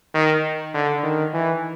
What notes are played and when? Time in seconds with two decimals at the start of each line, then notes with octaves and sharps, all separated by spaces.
0.15 D#3
0.74 D3
1.04 D#3
1.33 E3